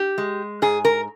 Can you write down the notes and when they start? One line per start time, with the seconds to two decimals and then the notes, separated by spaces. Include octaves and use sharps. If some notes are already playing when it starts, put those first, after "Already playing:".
Already playing: G4
0.18 G#3
0.62 G#2 G#4
0.85 A#4